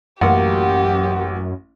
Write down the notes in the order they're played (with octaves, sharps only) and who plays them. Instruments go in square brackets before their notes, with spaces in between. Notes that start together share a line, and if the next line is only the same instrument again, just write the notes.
[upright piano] A1 A#3 [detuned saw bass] F#2 [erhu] G4 [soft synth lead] F#5